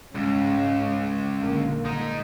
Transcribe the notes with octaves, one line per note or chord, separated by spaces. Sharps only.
C#2 G#2 G#3 C#4
A#1 D3 A#3
G#3 D#4